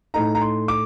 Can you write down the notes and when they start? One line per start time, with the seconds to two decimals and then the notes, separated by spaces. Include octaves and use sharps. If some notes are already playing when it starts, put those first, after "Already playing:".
0.14 A2 A3 D#4 A#5
0.35 A#5
0.42 C6
0.68 D6